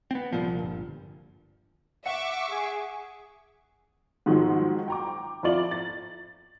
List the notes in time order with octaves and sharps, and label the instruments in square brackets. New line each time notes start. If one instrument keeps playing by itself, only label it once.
[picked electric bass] B3 C4
C2 A#2 F3
G1
[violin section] E5 C#6 D6 [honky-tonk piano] F#5 C#7
[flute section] G#4
[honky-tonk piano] G#2 D#3 F3 F#3 G#3
G5 A#5 D6
F2 E4 F4 D5 F#7
A6